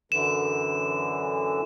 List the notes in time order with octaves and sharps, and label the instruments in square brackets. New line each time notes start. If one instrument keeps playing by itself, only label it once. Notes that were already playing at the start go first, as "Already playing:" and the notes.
[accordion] F#2 D3 E3 [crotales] E7